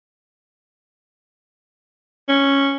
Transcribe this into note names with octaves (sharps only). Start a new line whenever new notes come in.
C#4